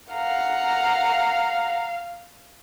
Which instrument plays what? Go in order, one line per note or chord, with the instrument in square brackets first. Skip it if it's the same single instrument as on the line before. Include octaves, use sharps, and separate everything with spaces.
[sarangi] F5 [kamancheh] F#5 A#5